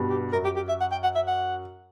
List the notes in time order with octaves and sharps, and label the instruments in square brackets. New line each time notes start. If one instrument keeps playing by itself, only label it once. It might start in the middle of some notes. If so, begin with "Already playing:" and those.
Already playing: [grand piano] G2 B2
[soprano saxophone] G4
[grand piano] F#2 [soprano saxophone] A#4
[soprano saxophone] G4
G4
E5
F#5
G5
F#5
E5
F#5